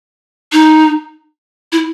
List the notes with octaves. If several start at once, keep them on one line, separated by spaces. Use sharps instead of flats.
D#4
E4